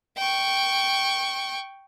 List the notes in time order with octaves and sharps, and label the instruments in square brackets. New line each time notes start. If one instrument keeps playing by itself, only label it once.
[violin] G5 C#6